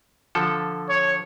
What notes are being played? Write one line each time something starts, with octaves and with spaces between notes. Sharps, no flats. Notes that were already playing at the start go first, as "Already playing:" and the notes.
D3 F3 A4
C#5